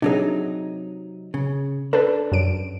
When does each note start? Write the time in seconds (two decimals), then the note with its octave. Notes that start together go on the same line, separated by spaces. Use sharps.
0.02 C3 F#3 D4 D#4 G#4
1.34 C#3
1.93 D4 A4 B4
2.32 F#2 D7